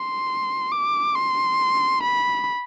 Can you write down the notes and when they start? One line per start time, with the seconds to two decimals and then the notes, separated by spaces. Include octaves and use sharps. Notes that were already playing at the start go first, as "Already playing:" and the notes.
Already playing: C6
0.72 D6
1.15 C6
2.03 B5